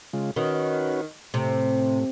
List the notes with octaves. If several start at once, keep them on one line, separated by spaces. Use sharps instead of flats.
C#3 G#3 F4
D#3 C#4 F#4 B4
A2 C3